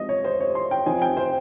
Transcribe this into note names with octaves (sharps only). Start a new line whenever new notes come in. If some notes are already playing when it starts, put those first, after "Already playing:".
Already playing: F3 G#3 C4 D#4 D#5
C#5
C5
C#5
C6
G5
F3 C4 D#4 G#5
G5
C5